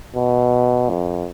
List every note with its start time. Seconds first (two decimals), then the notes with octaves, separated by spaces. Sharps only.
0.15 B2
0.90 F2